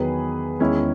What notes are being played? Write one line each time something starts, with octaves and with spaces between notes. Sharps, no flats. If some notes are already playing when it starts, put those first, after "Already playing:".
Already playing: E2 D#3 F#3 G#4 B4
E2 D#3 G#3 C#4 E4